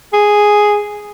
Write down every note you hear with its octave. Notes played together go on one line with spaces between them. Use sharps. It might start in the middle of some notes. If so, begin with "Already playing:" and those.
G#4